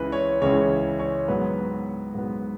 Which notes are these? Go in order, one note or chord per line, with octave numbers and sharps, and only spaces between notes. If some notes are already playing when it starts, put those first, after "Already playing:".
Already playing: C#2 C#3 E3 B4
C#5
C#2 C#3 E3 C#5
C#5
G#2 F#3 B3 B4
G#2 F#3 B3